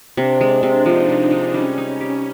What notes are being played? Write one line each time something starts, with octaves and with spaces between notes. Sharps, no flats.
C3 D4
G#3
C3
F3 D#4
C3
G#3
G3 C#4
D#4
G4